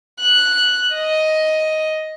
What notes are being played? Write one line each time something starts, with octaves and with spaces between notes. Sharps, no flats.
F#6
D#5